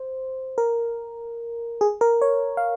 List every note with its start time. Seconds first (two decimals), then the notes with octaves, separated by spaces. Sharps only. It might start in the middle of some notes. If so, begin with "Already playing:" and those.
Already playing: C5
0.58 A#4
1.81 G#4
2.01 A#4
2.22 C#5
2.57 F5